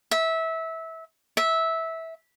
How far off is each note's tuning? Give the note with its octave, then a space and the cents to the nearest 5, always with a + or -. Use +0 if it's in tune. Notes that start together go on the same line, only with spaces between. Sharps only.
E5 -20
E5 -15